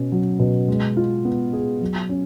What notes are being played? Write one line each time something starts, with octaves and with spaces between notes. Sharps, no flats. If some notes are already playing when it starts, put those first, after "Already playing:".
Already playing: B2 C#4
F#3
B2
G#3
F4
B3
G#4
F#3
C#4